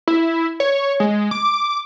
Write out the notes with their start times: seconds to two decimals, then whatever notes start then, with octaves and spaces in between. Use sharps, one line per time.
0.08 E4
0.60 C#5
1.00 G#3
1.31 D6